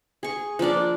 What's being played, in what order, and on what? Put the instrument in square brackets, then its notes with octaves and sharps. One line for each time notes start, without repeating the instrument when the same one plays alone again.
[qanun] G#4 C#6
F3 A#3 D4 D5